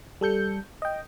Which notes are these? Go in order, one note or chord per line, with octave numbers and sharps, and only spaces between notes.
G3 A4 G6 C#7
D#5 G5